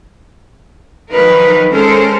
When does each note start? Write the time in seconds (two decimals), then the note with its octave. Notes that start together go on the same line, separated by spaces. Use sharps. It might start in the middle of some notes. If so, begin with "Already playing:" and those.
1.11 D#3 F3 F#3 D#4 A#4 B4
1.70 G#3 C#4 A4 A#4 C5